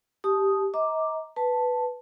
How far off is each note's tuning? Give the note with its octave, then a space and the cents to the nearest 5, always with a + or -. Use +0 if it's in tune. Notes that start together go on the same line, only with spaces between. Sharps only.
G4 +0 A5 -30 D#6 +0
D#5 +35 A#5 +0 D6 +0
B4 +0 A5 +0